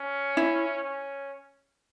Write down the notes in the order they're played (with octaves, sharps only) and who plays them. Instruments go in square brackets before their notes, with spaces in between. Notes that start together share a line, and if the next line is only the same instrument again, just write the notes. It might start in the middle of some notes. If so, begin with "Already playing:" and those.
Already playing: [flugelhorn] C#4
[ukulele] E4
[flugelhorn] C#4